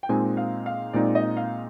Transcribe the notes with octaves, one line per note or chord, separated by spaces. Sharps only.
G5
A#2 G#3 C4 D#4 G#5
F5
F5
A#2 G#3 C4 D#4 D5
D#5
F5